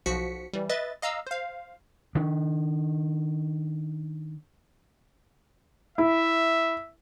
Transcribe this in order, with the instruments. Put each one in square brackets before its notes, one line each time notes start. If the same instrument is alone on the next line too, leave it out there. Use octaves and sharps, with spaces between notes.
[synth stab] B1 F3 F#4 B6 C#7
E3 G3
B4 D#5 E5 A6
D#5 F5 A#5 E6
C5 F5
[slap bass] D#3 D4
[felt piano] E4 [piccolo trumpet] E5